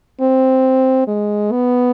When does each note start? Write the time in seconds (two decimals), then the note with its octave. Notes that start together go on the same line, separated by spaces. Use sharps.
0.21 C4
1.07 G#3
1.51 B3